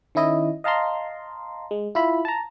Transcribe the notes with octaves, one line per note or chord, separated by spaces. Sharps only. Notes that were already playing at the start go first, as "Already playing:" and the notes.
D#3 C#4 E4 D#5
D#5 F5 A5 A#5 C6
G#3
E4 F4 E5 B5
A5 A#5